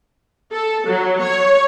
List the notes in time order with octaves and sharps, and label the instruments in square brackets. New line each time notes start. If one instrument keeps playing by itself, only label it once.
[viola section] A4
F#3
C#5